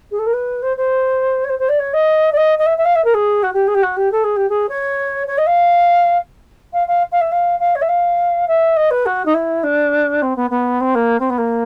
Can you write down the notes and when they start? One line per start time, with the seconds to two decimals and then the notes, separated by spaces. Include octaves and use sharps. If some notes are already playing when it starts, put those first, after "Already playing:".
0.11 G#4
0.19 A4
0.26 A#4
0.33 B4
0.62 C5
0.77 C5
1.44 C#5
1.49 C5
1.59 C5
1.68 D5
1.79 C#5
1.93 D#5
2.32 D5
2.37 D#5
2.58 D#5
2.66 E5
2.78 E5
2.85 F5
2.95 E5
3.04 A#4
3.14 G#4
3.43 F#4
3.53 G4
3.67 G#4
3.74 G4
3.82 F#4
3.96 G4
4.11 A4
4.24 G#4
4.36 G4
4.49 G#4
4.69 C#5
5.27 C#5
5.38 D#5
5.46 F5
6.73 F5
6.87 F5
7.12 F5
7.21 E5
7.31 F5
7.59 F5
7.75 C#5
7.81 E5
7.88 F5
8.48 E5
8.76 D#5
8.90 B4
9.06 F#4
9.25 D#4
9.34 E4
9.63 D4
10.22 C4
10.36 B3
10.50 B3
10.80 C4
10.95 A#3
11.19 C4
11.29 B3
11.38 A#3